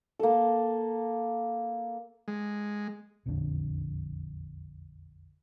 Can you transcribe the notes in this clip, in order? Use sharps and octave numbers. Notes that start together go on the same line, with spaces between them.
A#3 A4
G#3
E1 A#1 F2 D3